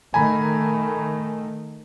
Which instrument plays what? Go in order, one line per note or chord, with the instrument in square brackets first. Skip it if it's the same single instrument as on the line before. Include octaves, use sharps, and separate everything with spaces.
[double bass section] D#3 A3 [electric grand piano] G#5 A#5 B5